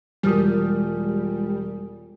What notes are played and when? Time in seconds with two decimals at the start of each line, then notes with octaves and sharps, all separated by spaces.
0.23 E1 G3 G#3 F4 G4 A#4 D#6